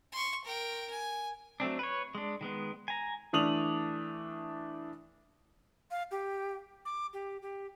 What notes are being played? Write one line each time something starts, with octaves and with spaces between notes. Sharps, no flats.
C6 C#6
A#4 G5
G#5
F#3 A3 C4 D4
B4 C#5
G#3 D4
D#3 G#3 B3
G#5 A#5
E3 A3 D4 D#6 F7 F#7
F5
G4
D6
G4
G4